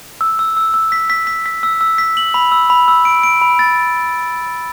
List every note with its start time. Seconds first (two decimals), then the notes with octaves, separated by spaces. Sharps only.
0.21 E6
0.39 E6
0.57 E6
0.74 E6
0.92 B6
1.10 B6
1.27 B6
1.46 B6
1.63 E6
1.81 E6
1.98 B6
2.17 F#7
2.34 B5
2.52 E6
2.70 B5
2.88 E6
3.05 D7
3.23 D7
3.41 B5
3.59 A6